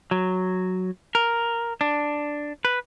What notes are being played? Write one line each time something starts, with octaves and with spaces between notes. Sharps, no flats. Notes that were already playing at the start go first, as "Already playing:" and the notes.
F#3
A#4
D4
B4